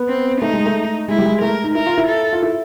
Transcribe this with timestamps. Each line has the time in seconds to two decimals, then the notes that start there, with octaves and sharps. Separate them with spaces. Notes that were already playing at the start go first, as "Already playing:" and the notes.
Already playing: B3
0.08 C4
0.41 A3 D#4
0.53 G#3
0.66 A3
1.08 G#3 E4
1.18 G3
1.25 G#3
1.42 A3 A#4
1.64 D#4
1.75 E4 A#4
1.87 F4
1.98 E4
2.09 A4
2.33 F4
2.43 E4